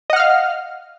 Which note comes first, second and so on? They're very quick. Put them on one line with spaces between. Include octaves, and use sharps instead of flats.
D#5 F#5 F6 F5